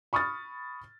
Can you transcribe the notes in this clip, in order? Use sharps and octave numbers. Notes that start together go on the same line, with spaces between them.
B5 C#6 D#6 F6 A6